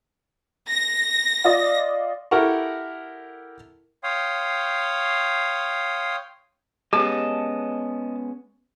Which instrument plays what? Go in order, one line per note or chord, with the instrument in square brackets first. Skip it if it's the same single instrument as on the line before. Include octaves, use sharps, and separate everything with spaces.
[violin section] A#6
[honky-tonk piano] F4 D5 D#5
[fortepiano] E4 G4 A4 A#4 F#5 C#6
[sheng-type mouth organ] C#5 F5 G5 C6 D#6
[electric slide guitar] G#3 B3 C#4 [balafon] G4 [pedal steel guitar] D#5 A5